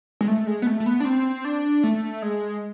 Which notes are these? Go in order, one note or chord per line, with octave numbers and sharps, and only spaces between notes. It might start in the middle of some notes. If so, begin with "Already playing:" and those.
G#3
A3
G#3
B3
A3
A3
B3
D4
C4
D4
A3
G#3